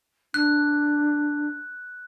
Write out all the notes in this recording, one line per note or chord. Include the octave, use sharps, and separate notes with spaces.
D4 F#6